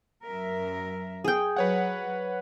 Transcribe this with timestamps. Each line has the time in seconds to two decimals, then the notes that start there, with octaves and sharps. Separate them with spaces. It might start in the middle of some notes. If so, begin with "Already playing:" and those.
0.25 F#2 A#4 E5
1.24 G#4 G5
1.57 F#3 B4 C#5 F#5